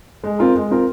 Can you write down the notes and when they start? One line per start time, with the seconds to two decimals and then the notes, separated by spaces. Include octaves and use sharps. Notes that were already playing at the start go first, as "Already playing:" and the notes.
0.24 G#3
0.39 C4 F4 A#4
0.55 G#3
0.71 C4 F4 A#4